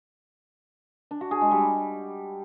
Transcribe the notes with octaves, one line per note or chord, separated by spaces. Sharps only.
D4
F#4
G#4
G#3
G3